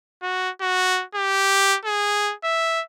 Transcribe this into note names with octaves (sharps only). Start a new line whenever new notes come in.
F#4
F#4
G4
G#4
E5